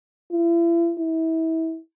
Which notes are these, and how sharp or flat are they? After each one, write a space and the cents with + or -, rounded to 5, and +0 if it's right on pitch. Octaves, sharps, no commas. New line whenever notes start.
E4 +40
E4 -30